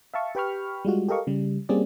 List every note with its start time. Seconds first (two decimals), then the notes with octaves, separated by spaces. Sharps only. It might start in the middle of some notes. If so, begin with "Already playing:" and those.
0.14 E5 F5 A5 C#6
0.35 G4 B4 G5 B5 C#6 F6
0.85 G3 G#3 F4 F#4
1.09 G4 A4 A#4 D#5 F5 C#6
1.27 C#3 G3
1.69 G3 A#3 C4 C#4 G#4 D5